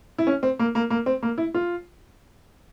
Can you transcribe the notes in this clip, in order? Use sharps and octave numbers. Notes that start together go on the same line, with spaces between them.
E4
C#4
C4
A#3
A#3
A#3
C4
A#3
E4
F4